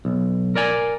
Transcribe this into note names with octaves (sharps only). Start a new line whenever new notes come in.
B1
A#4 D5 G#5